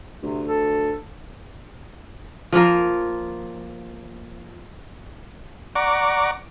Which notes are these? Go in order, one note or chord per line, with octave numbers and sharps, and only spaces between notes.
D2 C3
A4
F3 A#3 F4 A#4
D5 F#5 A#5 C#6 D6